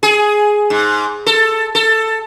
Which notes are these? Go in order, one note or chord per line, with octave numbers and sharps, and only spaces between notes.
G#4
G#2
A4
A4